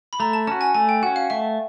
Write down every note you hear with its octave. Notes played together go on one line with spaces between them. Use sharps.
B5
A3 A#5
A5
C#4 F#4 A5
G#5
A3 G#5
G5
C#4 F#4 F#5
F5
A3 E5